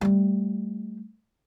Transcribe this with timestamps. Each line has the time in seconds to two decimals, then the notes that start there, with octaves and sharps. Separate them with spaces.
0.01 G3 A3